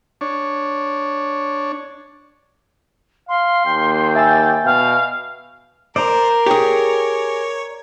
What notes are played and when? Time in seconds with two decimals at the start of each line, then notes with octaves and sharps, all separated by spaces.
0.21 D4 C#5
3.29 F5 C6
3.66 D#2 G5
4.15 E5 G#5 E6 A6
4.65 B2 F5
5.96 A#4 C5 D5 A#5
6.46 G4 G#4 C#5